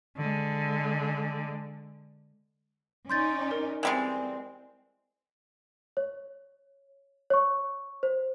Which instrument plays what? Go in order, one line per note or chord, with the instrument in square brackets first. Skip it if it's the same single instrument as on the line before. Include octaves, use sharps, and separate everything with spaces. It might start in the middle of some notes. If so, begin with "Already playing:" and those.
[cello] D3 G#3
[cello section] C#4 D#4 D5 [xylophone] C6 G6 A6
[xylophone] A#4
[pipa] E3 G3 G#3 [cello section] C4
[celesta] C#5
C#5 C#6
C5